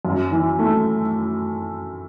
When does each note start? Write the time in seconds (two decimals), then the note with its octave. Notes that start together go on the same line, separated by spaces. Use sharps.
0.05 F#2
0.31 E3
0.59 A3